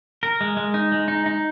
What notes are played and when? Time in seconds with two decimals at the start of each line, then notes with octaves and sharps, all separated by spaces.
0.23 A#4
0.41 G#3
0.57 G#3
0.74 D#4
0.92 G#3
1.08 D#4
1.26 D#4